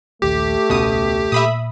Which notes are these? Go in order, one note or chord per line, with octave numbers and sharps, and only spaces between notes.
D#1 A#1 D#2 A3 G4
E1 C#2 B2 C#4 D#6
A#2 E5 B5 D#6